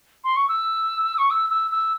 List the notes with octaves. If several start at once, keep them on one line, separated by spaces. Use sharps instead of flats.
C6
C#6
E6
C#6
E6
E6
E6